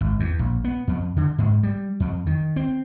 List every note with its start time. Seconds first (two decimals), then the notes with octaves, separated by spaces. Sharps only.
0.01 G#1
0.20 E2
0.39 A#1
0.64 B3
0.88 F2
1.17 D3
1.38 G#2
1.63 G3
2.00 F2
2.27 D#3
2.56 C4